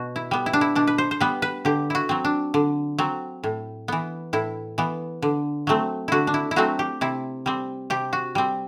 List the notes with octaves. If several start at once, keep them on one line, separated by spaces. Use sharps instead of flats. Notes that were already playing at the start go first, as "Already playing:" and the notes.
Already playing: B2 F#4
E4
G3 B3
E4
D4
E4
B2 D4
B4
C5
C5
G3 B3 B4
B4
D3 G4
E4 F#4
F#3 C4
D4
D3
F#3 C4
A2
E3 B3
A2 E4
E3 B3
D3
F#3 A3 C4
D3 E4 F#4
D4
E4
E4
F#3 A3 C4 F#4
G4
C3 E4
G3 C4
C3 G4
F#4
G3 C4